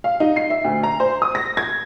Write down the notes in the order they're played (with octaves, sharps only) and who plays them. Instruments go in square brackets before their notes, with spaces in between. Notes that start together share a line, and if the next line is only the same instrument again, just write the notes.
[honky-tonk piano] F5
D#4
C7
E5
D2
A#5
C5
D#6
A#6
G#6